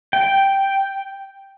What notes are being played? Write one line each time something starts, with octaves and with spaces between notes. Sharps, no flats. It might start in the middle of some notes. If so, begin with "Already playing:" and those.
G5